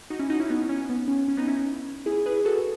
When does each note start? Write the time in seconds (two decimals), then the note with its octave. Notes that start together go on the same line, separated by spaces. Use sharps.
0.10 D#4 F#4
0.19 C#4 E4
0.30 D#4 F#4
0.40 C#4 E4
0.49 B3 D#4
0.69 C#4
0.89 B3
1.08 C#4
1.28 C#4
1.37 B3 D#4
1.48 C#4 E4
2.06 E4 G#4
2.26 G#4 B4
2.40 G#4
2.45 F#4 A4